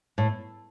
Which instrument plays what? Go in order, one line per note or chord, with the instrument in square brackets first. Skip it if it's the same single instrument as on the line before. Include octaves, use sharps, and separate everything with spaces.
[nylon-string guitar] A2